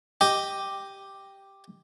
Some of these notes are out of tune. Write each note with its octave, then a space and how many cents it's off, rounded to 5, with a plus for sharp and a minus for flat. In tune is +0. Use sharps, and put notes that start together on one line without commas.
G4 +0 D#5 +0